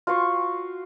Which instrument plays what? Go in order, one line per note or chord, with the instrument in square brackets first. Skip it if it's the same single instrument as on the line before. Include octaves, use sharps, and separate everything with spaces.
[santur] F4 F#4 C5 C#6